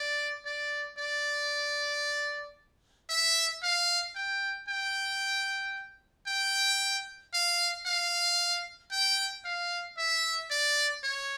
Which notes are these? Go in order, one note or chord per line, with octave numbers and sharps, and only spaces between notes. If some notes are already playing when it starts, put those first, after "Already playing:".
Already playing: D5
D5
D5
E5
F5
G5
G5
G5
F5
F5
G5
F5
E5
D5
C#5